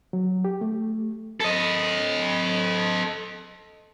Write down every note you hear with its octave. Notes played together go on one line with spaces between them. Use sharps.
F#3
G4
A3
A4 D#5